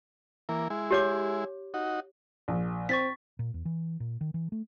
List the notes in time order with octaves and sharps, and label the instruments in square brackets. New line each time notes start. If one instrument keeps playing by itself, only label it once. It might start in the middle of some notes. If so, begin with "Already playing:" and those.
[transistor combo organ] E3 A#3
G#3 E4
[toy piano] G4 C#5 D6
[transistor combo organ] D#4 F#4
[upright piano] A#1
[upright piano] C4 [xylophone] C#6 A6 B6
[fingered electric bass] A#2
E2
E3
A#2
D#3
E3
A3